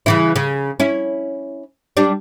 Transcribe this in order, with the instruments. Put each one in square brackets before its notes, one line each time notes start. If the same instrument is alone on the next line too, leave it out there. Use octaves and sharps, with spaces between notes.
[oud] C#3 E3 E4
C#3
C#4 E4
G3 D4